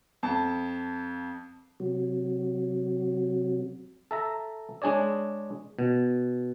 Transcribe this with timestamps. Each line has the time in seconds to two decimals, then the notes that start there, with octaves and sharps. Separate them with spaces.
0.23 F2 A5
1.80 C3 F#3
4.11 A4 E5 A#5
4.82 G#3 D4 G#4 C#5 D5
5.79 B2